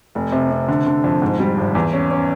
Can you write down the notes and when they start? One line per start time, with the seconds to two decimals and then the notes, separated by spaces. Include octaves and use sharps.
0.15 F1
0.32 C3
0.51 C3
0.68 D3
0.87 D3
1.04 F2
1.22 G#2
1.40 G3
1.58 G#1
1.75 E2
1.93 C#4
2.11 C#4